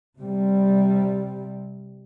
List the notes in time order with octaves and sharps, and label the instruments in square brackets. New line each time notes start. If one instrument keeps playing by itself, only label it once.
[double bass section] C3 G3